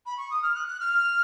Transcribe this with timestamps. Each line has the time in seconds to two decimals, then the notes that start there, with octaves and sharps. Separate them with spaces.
0.06 B5
0.17 C#6
0.30 D#6
0.42 F6
0.55 F#6
0.67 F#6
0.80 F6